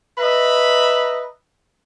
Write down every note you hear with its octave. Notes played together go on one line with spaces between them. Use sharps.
B4 D#5 E5 A#5 B5